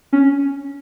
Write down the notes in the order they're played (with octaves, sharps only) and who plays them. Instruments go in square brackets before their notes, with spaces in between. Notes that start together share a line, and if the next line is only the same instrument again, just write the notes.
[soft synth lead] C#4